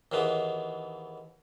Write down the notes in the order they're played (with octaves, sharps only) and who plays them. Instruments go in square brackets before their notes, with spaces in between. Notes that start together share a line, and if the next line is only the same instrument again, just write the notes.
[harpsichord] D#2 G#2 E3 B3